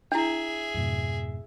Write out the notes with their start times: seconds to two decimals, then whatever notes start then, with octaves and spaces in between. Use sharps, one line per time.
0.12 D4 E4 G#4 E5
0.75 F2 G#2 B2